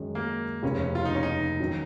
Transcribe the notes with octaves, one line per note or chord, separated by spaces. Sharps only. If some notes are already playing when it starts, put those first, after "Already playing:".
Already playing: F#2 D#3 G#3
A#3
F1 D#2 C#3 C#4
C#4
F4
D#4
C#4
D#4
D#3 F#3 C#4